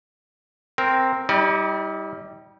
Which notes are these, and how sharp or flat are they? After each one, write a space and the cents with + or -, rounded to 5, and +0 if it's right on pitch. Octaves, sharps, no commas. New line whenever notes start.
C4 +0 A#4 +0
G3 -5 D#4 +45 D5 +40